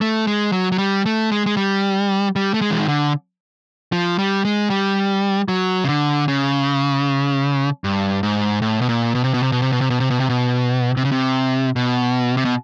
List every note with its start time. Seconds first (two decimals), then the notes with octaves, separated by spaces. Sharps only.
0.01 A3
0.27 G#3
0.52 F#3
0.72 F#3
0.78 G3
1.06 A3
1.32 G#3
1.46 G#3
1.57 G3
2.36 G3
2.54 A3
2.61 G#3
2.71 E3
2.79 D#3
2.88 D3
3.92 F3
4.19 G3
4.45 G#3
4.70 G3
5.48 F#3
5.84 C#3
5.89 D3
6.28 C#3
7.84 G2
8.23 G#2
8.62 A2
8.82 B2
8.89 A#2
9.15 B2
9.24 C3
9.34 B2
9.43 C3
9.52 B2
9.62 C3
9.72 B2
9.81 C3
9.90 B2
10.00 C3
10.11 B2
10.20 C3
10.29 B2
10.97 C3
11.05 C#3
11.12 C3
11.76 B2
12.37 C3
12.45 B2